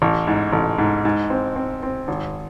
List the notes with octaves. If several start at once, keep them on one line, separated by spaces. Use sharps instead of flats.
A1
G#2
A1
G#2
G#2
C4
C4
C4
G#1